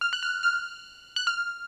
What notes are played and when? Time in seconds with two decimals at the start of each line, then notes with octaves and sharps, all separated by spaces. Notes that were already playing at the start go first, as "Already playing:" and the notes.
0.01 F6
0.13 F#6
0.23 F6
0.43 F6
1.16 F#6
1.27 F6